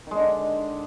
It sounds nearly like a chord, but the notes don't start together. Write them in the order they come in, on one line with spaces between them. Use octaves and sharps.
D#3 G#3 D4 D3